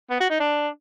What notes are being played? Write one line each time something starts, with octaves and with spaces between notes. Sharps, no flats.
B3
F#4
D#4
D4